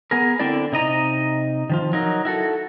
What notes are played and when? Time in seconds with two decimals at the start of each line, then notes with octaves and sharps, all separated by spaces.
0.11 B3 G#4 A#4
0.39 D3 C4 D4 E4 D5
0.72 C3 D#4 D#5 A#5
1.70 D#3 F3 F4
1.93 F#3 D#4 A#4
2.25 E4 F#4 A4